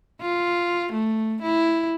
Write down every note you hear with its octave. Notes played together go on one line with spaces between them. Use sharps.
F4
A3
E4